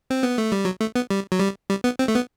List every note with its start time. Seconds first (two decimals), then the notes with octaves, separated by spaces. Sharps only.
0.10 C4
0.23 B3
0.38 A3
0.52 G3
0.65 F#3
0.81 A3
0.96 B3
1.10 G3
1.32 F#3
1.40 G3
1.70 G3
1.84 B3
1.99 C4
2.08 A3
2.15 B3